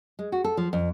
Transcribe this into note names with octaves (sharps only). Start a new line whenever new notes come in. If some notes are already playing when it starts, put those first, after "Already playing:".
G#3
F#4
A4
F3
F2